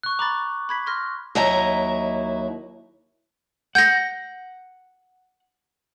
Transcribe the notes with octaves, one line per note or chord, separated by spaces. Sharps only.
C#6 F#6
A#5 B5 D6 A6
B5 G#6 B6
C6 F6 A#6
D#2 F#3 E4 D#5 E5 A#5
F#5 G6 A#6